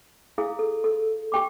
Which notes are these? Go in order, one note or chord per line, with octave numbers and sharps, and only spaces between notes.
E4 G#4 F5 D#6
A4
A4
G4 G5 D6